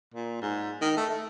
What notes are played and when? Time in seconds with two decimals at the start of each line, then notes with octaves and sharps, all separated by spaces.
0.14 A#2
0.42 G#2
0.81 D#3
0.97 A3
1.09 A3